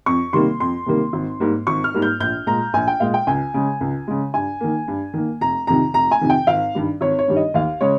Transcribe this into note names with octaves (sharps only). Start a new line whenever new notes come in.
F2 C#6
C3 D#3 G3 A#3 C6
F2 C6
C3 D#3 G3 A#3
G#1
G#2 G3 A#3
G#1 C#6
F6
G#2 G3 A#3
G6
A#1 G6
A#2 G#3 A#5
A#1 G#5
G5
A#2 G#3 F5
G5
C#2 G#5
C#3 G#3
C#2
C#3 G#3
G2 G#5
D#3 A#3
G2
D#3 A#3
F1 A#5
F2 C3 D#3 A#5
F1 A#5
G#5
F2 C3 D#3
G5
G#1 F5
G2 D#3 G3
G#1 C#5
C#5
G2 D#3 G3
D#5
D#2 F5
C#3 G#3 C#5